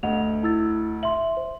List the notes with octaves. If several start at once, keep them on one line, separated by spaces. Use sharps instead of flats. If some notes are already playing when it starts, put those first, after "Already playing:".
D2 D#5 F#5 F7
E4 E6 A6
E5 C6 F#7
C5